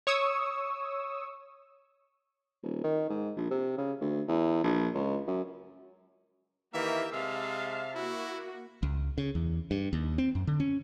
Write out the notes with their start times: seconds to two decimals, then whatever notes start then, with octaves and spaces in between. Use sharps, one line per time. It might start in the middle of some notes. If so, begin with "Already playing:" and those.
0.07 C#5 C#6 D#6 E6
2.63 D#1
2.84 D#3
3.10 G#2
3.37 A#1
3.51 C3
3.78 C#3
4.01 D2
4.28 E2
4.64 A#1
4.94 C#2
5.27 F#2
6.73 D#3 E3 A#3 G4 E5
7.12 C3 G#3 E5 F5 A5
7.95 A#3 E4 F#4
8.83 C#2
9.18 C#3
9.35 E2
9.71 G2
9.93 D#2
10.18 C4
10.35 F#2
10.47 D3
10.60 C#4